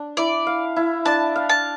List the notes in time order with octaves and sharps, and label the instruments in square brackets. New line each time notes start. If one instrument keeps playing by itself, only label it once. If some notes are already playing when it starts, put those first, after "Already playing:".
Already playing: [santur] D4
[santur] E4 [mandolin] D5
[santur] F5
E4
[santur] D4 [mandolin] A5
[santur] F5
[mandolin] A5